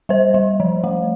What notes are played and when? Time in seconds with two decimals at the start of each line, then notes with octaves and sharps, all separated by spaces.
0.09 G3 C5
0.34 G3
0.60 F3
0.84 A3